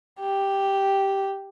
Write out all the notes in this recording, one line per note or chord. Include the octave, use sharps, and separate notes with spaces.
G4